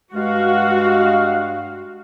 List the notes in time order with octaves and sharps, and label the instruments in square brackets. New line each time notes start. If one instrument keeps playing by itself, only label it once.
[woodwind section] G2 G#3 F5 [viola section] F#4